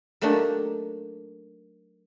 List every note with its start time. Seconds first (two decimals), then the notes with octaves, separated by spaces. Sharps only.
0.21 F#3 A3 A#3 D4 D#4 G4